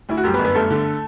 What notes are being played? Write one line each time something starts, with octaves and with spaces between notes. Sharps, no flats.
D2 E4
F#4
F#2 G3 G4
B3 B4
G1
B3 B4
G2 A3 A4
D3